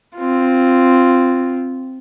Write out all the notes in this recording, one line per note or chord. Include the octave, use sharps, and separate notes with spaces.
C4 F4